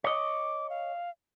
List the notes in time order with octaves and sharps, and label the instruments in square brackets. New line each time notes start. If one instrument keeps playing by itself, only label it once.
[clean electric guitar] C#5 D#5 [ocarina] D6
[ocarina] F5